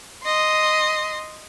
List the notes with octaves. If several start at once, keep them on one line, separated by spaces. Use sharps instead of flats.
D#5 C6